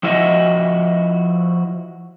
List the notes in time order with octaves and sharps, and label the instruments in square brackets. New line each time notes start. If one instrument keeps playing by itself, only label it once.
[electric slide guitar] F3 E4 F#4 G4 D#5 E5